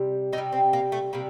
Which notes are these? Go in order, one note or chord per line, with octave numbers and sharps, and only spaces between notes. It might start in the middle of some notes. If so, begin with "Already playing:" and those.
Already playing: C3 G3
C3 D#4
G3
C4
A#3
A3
C3 G3 A#3